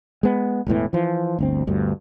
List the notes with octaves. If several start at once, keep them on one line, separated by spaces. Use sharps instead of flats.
G#3 B3
E1 E2 A2 E3
E3 F3
G1 D2 C4
G1 D2 G2